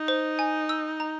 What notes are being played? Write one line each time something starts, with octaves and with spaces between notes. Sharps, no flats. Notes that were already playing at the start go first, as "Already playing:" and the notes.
Already playing: D#4
C5
G#5
E6
A#5